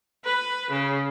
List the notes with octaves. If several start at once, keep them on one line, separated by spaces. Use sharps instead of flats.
B4
C#3